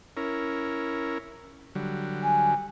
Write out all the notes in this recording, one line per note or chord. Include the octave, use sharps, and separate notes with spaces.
C#4 E4 A#4
D3 F#3 G3
G#5